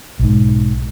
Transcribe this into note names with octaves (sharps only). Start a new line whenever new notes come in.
B1 G#2